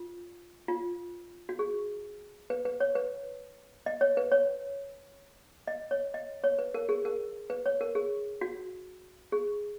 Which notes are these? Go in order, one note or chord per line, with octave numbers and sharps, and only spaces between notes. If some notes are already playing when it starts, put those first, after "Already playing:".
Already playing: F4
F4
F#4
G#4
B4
B4
C#5
B4
D#5
C#5
B4
C#5
D#5
C#5
D#5
C#5
B4
A#4
G#4
A#4
B4
C#5
A#4
G#4
F#4
G#4